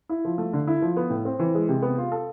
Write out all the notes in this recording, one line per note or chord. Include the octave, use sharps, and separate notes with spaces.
E4
F3
A3
D3
E4
F3
B3
A2
C4
E3
G#3
C3
B3
F4
A4